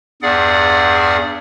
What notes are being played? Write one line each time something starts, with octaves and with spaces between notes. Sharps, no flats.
E2 G2 G#4 D5 F#5